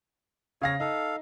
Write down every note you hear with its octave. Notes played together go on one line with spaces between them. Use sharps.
C#3 C#5 F5 A#6
D#4 A4 F5